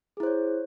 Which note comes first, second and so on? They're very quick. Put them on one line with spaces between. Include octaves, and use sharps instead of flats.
G#4 E4 C5 C#5